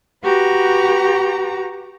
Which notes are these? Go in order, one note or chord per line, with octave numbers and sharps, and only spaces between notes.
F#4 G4 B4 A#5